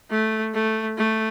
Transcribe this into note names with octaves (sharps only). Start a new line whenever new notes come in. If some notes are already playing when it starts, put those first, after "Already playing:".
A3
A3
A3